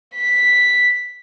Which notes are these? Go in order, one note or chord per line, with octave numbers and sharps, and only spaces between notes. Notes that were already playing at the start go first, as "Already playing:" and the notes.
B6